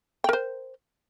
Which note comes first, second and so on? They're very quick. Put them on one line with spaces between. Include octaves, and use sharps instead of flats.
G5 A#4 C5